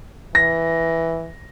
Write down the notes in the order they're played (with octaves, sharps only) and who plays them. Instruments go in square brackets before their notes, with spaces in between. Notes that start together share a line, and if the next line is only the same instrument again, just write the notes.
[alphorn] E3 [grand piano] A#6